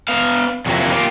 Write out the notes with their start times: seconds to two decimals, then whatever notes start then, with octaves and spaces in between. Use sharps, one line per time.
0.08 B3 F5
0.66 F2 C3 F#3 A#3 E4
0.90 A#3 F4 G4